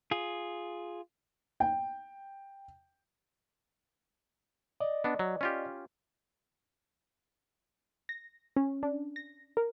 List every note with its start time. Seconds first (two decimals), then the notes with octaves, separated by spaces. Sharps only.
0.11 F4 G#4
1.60 G5
4.80 D5 D#5
5.04 B3 D4
5.19 F#3
5.41 C#4 F4 G4
8.09 A#6
8.56 C#4
8.83 D4
9.16 A#6
9.57 A#4